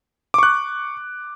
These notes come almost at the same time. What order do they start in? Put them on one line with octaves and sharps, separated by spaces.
D6 C#6 F#6